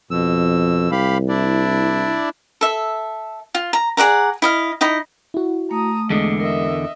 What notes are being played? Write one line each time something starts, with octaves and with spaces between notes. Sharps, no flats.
F2 B2 E6
C2 G4 F5 B5
D4 E4 D5
A4 E5
F4
A#5
G#4 D5 F#5 A#5
E4 D#5 F5
D#4 E4 D#5
E4 F#4
A3 A#5 D#6
E2 D3 G#3 D#5
A#4 D#5 E5